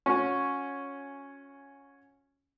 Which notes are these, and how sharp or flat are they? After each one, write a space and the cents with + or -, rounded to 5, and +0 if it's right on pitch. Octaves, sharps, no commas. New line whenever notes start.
C#4 +0 F#4 -35